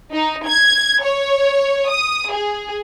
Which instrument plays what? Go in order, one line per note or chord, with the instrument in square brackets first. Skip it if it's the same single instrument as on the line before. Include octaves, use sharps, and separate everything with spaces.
[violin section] D#4
G#6
C#5
D#6
G#4